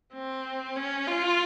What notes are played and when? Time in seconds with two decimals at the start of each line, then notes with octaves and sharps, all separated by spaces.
0.13 C4
0.76 C#4
1.07 F4